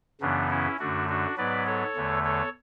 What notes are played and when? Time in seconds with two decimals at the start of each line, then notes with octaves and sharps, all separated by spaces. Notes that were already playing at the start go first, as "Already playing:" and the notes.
0.21 F#2 C#3 E3 B3 D4
0.50 C#4 E4
0.79 F#2 D3 A3 D4 F#4
1.09 D4 F#4
1.37 G#2 F#3 B3 B4 D5
1.66 A4 C#5
1.95 E2 D3 A3
2.24 A4 C#5